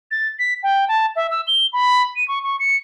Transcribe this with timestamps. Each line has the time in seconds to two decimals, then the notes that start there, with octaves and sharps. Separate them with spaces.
0.11 A6
0.39 B6
0.63 G5
0.88 A5
1.16 E5
1.31 E6
1.47 G7
1.73 B5
2.16 D#7
2.28 C#6
2.44 C#6
2.60 C#7